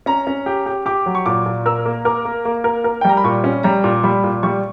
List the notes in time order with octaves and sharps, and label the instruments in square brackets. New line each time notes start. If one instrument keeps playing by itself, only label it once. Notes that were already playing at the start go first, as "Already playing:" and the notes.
[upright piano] C#4 [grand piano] A#5
[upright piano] C#4
G4
G4
[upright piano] G4 [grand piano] D6
[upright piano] F#3
[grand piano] C#6
[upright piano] A#2 [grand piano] D6
[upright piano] A#2
[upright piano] A#4 [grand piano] E6
[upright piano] A#3
[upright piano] A#4 [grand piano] D6
[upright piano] A#3
A#3
A#4
A#4
[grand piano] G5
[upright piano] G3 [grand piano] A#5
[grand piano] B5
[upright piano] A#2 [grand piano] C#6
[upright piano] C#4
[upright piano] G3 [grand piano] A#5
[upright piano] A#2
[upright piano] G3 [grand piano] B5
[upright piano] A#2
[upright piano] G3 [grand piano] C#6